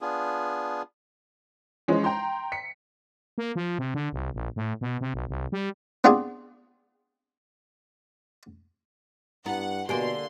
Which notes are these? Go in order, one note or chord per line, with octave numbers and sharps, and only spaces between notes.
B3 D4 F4 G#4
E3 F3 G#3 C#4
G5 A#5 C6
B6 C#7
A#3
F3
C3
D3
C2
A#1
A2
B2
C3
B1
C2
G3
B3 C4 D4 F4 G4 G#4
G2 B3 E4 F#5
B2 D3 A#3 G4 G#5 C6